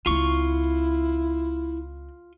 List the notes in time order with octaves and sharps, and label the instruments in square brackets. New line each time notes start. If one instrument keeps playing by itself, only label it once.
[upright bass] C#2 C4 [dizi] E4 [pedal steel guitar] F4 C#6